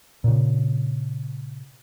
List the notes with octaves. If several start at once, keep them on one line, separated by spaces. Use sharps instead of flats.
A#2 C#3